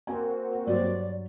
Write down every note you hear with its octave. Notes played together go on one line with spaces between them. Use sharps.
A#3 C4 F#4 A#4 G#5
G2 F#3 C5 D5